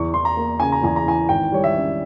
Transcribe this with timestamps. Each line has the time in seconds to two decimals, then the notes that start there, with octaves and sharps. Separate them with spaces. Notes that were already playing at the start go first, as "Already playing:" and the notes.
Already playing: E2 C#6
0.14 E3 C6
0.25 A#5
0.37 A#3
0.60 C#3 G#5
0.72 A#5
0.83 E2 G#5
0.96 A#5
1.06 E3 G#5
1.29 G#1 G5
1.52 G3 C#5
1.64 E5
1.75 C#4